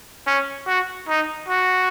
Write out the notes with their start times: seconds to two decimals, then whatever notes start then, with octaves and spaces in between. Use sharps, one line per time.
0.27 C#4
0.67 F#4
1.08 D#4
1.48 F#4